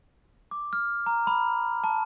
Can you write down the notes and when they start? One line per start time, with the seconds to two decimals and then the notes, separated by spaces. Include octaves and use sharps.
0.51 D6
0.73 F6
1.06 A#5
1.27 B5
1.84 A5